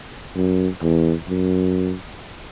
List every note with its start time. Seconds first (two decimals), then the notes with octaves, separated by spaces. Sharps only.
0.35 F#2
0.82 E2
1.28 F#2